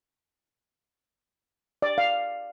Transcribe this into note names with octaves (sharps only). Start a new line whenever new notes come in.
D5
F5